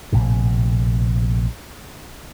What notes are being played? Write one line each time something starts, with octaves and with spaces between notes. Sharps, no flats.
A#1 A2 C3